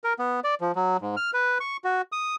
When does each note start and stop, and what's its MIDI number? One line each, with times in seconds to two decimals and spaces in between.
0.04 0.13 70
0.19 0.40 59
0.44 0.55 74
0.61 0.72 53
0.75 0.97 54
1.01 1.15 44
1.17 1.31 89
1.34 1.58 71
1.60 1.77 85
1.84 2.02 66
2.12 2.36 87